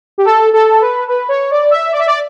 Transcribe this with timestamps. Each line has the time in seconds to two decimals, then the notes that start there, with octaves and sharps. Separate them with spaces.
0.18 G4
0.25 A4
0.53 A4
0.81 B4
1.08 B4
1.29 C#5
1.51 D5
1.71 E5
1.92 D5
1.99 E5
2.07 D5